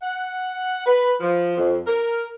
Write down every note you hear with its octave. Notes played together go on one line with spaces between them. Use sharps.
F#5
B4
F3
F2
A#4